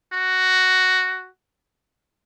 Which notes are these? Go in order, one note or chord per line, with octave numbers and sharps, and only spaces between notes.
F#4